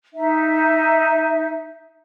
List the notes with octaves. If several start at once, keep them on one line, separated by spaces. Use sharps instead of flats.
D#4 E5